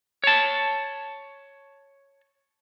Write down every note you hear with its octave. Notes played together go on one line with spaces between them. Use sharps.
C#5 A5